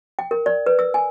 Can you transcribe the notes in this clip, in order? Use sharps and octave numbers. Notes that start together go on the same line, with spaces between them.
G5
A#4
D5
B4
E6
G#5